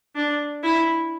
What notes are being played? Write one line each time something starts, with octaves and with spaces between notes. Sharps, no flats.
D4
E4